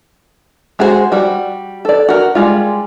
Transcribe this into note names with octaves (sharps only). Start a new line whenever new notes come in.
G#3 F#4 G#4 A#4 C5
G3 F#4
A4 D5
F#4 A#4
G3 G#3 F4